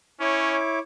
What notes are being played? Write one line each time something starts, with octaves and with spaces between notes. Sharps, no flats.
C#4 E4 C#5 D6